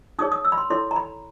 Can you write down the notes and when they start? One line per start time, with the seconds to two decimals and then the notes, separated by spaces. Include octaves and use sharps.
0.19 D#4 G#4 C#5 D#6
0.32 D#6
0.45 E6
0.52 B5
0.58 C6
0.70 E4 A4 C#5 C6
0.91 A#5
0.96 B5